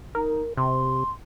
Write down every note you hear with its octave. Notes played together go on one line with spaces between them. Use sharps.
D#4 A#4
C3 C6